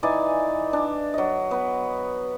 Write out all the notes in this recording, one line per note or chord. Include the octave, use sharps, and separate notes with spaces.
E3 D#4 D5 G#5
D4
F#3 D#5
B3 B4